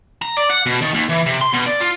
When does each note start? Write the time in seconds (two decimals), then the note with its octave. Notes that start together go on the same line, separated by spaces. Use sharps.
0.22 A#5
0.37 D5
0.50 F#5
0.66 B2
0.82 D#3
0.94 D#2
1.09 E3
1.26 C3
1.41 C6
1.53 B2
1.66 D5
1.81 F4